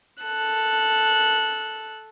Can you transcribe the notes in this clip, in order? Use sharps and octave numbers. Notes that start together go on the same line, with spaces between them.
A4 F#6